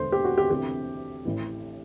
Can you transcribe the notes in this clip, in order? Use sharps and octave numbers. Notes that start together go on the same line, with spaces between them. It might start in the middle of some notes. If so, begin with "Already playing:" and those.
Already playing: E1 D2 D3 C5
G4
F#4
G4
D2 C3 E3 G4
A1 A2 E3